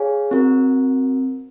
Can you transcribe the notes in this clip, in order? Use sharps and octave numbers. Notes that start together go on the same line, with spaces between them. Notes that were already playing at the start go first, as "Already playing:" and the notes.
Already playing: G#4 C#5 F5 G#5
C4 F#4 A#4